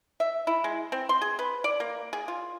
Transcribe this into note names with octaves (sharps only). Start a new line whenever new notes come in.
E5
E4
G#3
C4
C6
G#4
B4
D5
A#3
G#4
F4